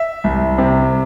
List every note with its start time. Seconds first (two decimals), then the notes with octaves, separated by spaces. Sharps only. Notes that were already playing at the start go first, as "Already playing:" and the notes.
Already playing: E5
0.24 C2
0.58 C3